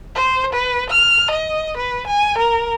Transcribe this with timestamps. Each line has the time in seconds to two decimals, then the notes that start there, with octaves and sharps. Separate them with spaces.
0.15 C5
0.53 B4
0.90 F6
1.31 D#5
1.77 B4
2.07 G#5
2.38 A#4